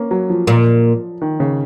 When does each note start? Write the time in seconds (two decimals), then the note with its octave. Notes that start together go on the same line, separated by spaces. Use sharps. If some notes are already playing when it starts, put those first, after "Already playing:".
Already playing: A#3 C#4
0.11 F#3
0.30 F3
0.47 A#2
1.21 D#3
1.40 C#3